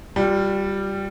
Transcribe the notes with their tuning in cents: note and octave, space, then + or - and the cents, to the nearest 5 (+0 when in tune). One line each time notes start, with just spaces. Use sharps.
G3 +0 F4 +35